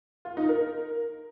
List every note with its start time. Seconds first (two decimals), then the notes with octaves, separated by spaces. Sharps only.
0.25 F4
0.37 D#4
0.49 A#4